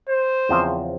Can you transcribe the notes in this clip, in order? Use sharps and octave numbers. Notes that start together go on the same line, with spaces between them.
C5
E2 C#3 F3 C4